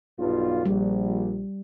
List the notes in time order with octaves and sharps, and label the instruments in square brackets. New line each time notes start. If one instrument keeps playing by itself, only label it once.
[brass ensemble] B1 G2 F4
[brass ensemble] A#1 [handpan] G3